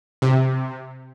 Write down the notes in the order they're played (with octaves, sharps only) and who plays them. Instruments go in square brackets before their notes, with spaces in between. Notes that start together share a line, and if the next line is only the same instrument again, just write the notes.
[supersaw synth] C3